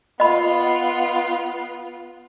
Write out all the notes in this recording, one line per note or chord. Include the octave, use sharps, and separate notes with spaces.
B3 F4 D#5 B5